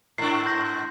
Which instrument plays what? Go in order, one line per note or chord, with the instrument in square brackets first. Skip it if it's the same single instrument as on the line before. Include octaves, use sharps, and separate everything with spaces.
[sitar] G#2 D4 [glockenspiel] C7
[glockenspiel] C6 G6 A#6